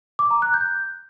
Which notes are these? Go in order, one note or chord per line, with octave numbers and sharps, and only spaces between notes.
D6
A#5
F#6
G6